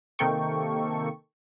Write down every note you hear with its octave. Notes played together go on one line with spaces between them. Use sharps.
C3 D#3 A#3 A4 G5 C#6